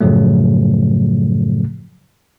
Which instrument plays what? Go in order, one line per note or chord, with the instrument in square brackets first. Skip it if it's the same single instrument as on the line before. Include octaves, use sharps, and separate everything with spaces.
[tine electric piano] F#2 A2 C#3 F3 F#3 A3